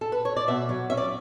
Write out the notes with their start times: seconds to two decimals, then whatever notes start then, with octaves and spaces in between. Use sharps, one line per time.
0.01 A4
0.12 B4
0.25 C#5
0.36 D5
0.48 B2 E5
0.69 F#3
0.90 C#4 E5
0.97 D5